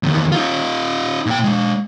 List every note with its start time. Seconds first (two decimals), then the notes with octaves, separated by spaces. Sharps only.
0.03 E2 D#3
0.32 D#4 F4
1.26 A#2 G5
1.44 G#3 D4